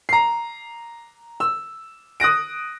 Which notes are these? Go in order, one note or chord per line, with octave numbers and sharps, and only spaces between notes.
A#5 C7
E6
D#6 F#6 A#6 D7